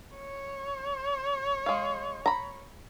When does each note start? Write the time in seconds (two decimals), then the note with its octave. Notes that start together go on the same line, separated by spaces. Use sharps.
0.16 C#5
1.66 G#3 F5
2.26 A#5 B5